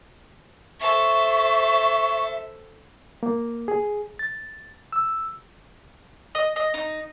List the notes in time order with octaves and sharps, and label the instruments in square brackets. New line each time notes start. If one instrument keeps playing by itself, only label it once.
[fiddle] A4 C5 [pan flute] E5 [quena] C#6
[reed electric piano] A#3
G#4
A6
E6
[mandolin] D#5
D#5
D#4